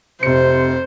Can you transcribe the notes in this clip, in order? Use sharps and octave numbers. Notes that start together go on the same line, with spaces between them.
F1 C3 C5 C#7